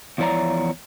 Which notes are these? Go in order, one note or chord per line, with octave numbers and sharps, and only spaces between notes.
E2 F3 E4 C#5 D5 A#5